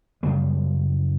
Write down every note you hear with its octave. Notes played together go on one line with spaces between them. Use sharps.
F#2 C#3 G3 G#3